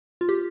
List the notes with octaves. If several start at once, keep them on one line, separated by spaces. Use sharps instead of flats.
F4
G4